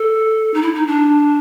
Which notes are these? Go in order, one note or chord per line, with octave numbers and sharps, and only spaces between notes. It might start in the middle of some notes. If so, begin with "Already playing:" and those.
Already playing: A4
D#4
E4
D#4
D4